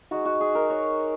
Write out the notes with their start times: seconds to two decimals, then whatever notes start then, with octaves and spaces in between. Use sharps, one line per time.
0.11 G#3 D#4 F#4
0.25 F#4
0.40 G#4
0.55 A#4
0.70 C#5